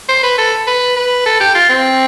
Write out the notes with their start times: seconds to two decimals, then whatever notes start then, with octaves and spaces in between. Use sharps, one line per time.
0.09 C5
0.23 B4
0.38 A4
0.67 B4
0.96 B4
1.26 A4
1.40 G4
1.55 F4
1.69 C4